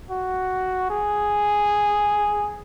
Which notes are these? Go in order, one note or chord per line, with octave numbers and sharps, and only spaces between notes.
F#4
G#4